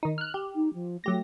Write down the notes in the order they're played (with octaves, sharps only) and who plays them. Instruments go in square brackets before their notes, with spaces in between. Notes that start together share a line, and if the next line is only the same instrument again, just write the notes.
[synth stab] D#3 D#4
F6 F#6
G4
[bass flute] D#4
F3
[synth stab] F#3 G4 A#6 [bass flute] A3